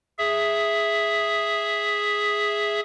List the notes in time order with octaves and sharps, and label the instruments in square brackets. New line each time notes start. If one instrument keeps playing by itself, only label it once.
[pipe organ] G#4 E5